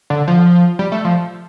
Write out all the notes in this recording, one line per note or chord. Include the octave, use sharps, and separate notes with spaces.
D3
F3
G3
A3
F3